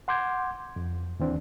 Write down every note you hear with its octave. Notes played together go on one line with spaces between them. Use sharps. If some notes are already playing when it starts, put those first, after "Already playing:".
F#5 C6 D6 G6 G#6
F2
D#2 E3 C4 D4